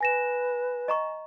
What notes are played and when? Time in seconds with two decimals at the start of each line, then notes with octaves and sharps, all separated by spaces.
0.01 B4 G#5 A#6 E7
0.88 D#5 A#5 C#6